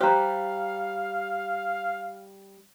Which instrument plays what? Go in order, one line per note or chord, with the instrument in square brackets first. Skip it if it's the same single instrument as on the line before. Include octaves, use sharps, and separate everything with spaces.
[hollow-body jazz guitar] G3 G4 [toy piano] C5 A#5 [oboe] F5